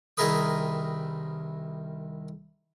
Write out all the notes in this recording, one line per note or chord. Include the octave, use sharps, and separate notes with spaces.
C2 D#3 G#4 A#4 B4 D#6